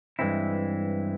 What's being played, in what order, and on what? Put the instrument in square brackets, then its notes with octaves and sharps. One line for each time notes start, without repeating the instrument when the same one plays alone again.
[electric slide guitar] G2 E3 G#3 C4 E4